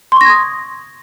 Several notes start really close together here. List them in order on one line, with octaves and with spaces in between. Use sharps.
C6 C#6 A#6 G#6 D#6